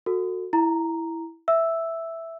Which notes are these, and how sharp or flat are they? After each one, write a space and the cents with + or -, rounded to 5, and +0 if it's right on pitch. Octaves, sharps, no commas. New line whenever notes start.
F#4 -10 A4 +30
E4 +0 A#5 +0
E5 +0 E6 +0